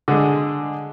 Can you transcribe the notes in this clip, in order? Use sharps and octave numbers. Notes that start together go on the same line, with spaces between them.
D3 G#3